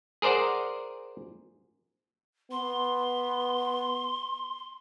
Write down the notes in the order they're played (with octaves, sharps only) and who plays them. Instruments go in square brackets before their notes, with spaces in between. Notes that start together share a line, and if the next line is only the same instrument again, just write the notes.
[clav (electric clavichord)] G#4 A#4 C5 D5 F#5
[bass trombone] B3 [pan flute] C6